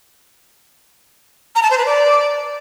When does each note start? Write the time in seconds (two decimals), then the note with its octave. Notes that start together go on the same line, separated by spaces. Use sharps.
1.55 A#5
1.63 A5
1.71 C5
1.78 B4
1.86 D5